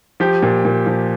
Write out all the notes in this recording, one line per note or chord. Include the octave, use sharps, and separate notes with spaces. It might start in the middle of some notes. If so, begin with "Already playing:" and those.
F3 G4
A#2
A#2
F3